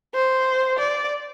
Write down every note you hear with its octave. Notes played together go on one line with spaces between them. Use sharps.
C5
D5